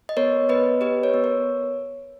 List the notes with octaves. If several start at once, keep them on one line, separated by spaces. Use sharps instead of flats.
D#5
B3 A#4 C#5
B3 B4 D#5
G4 B4 D#5
A#4 C#5
B3
A#4 C#5